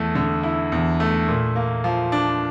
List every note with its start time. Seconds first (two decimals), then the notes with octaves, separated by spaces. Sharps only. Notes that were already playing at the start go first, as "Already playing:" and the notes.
Already playing: E2 A3
0.15 D3
0.43 E4
0.72 E2
1.00 A3
1.28 A#2
1.56 A#3
1.84 F3
2.12 D4